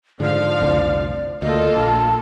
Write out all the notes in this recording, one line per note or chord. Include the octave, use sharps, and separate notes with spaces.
G#2 D3 F3 D5 F5
F1 C2 D3
D2 A#3 F4 A4 D#5
A#1 A5